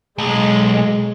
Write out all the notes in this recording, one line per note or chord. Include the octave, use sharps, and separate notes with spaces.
B1 G#3